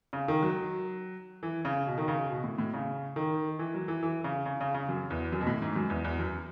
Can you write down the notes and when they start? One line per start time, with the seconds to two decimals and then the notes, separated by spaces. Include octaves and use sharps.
0.13 C#3
0.28 D#3
0.43 F#3
1.43 E3
1.65 C#3
1.87 B2
1.98 D#3
2.08 C#3
2.30 B2
2.44 A2
2.58 A2
2.73 C#3
3.16 D#3
3.59 E3
3.74 F#3
3.88 E3
4.03 E3
4.24 C#3
4.46 C#3
4.61 C#3
4.74 C#3
4.89 F#2
5.10 E2
5.32 F#2
5.41 B2
5.47 A2
5.62 G#2
5.76 F#2
5.90 E2
6.04 E2
6.19 F#2